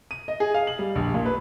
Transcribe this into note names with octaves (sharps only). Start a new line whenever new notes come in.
D#7
D#5
G#4
F5
F#7
G3
A#1
A#2
B4